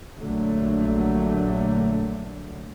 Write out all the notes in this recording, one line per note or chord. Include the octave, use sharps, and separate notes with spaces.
A#1 D3 F#3 A3